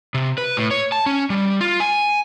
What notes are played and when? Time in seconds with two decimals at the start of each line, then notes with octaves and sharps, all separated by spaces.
0.14 C3
0.38 B4
0.57 A2
0.71 C#5
0.92 A5
1.06 C#4
1.30 G3
1.61 F4
1.80 G#5